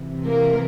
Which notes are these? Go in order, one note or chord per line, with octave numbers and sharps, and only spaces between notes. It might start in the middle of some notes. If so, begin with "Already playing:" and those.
Already playing: C3 E3
A#3 A#4